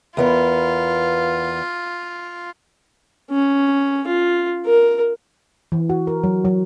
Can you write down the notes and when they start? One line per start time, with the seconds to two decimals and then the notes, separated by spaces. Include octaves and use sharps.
0.17 E2 B3 F4 A#4
3.31 C#4
4.07 F4
4.66 A#4
5.72 E3
5.90 F#4
6.07 A#4
6.24 F#3
6.45 F#3